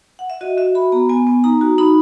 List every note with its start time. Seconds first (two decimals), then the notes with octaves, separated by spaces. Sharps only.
0.19 F#5
0.30 E5
0.41 F#4 D#5
0.57 F#4 E5
0.75 F#4 B5
0.92 B3 A#5
1.09 B3 G#5
1.27 B3
1.44 D#4 A#5
1.61 F#4
1.78 D#4 B5